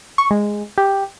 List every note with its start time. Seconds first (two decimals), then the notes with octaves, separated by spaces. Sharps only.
0.18 C#6
0.31 G#3
0.78 G4